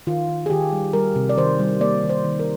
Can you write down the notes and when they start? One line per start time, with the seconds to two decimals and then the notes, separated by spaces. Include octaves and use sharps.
0.07 D#3 F4
0.29 D#3
0.46 G#4
0.50 D#3 G4
0.73 G3
0.93 G3 A#4
1.16 C3
1.29 D5
1.38 D#3 C5
1.59 G3
1.80 A#3 D5
2.03 D#3
2.09 C5
2.24 D#3
2.40 A#4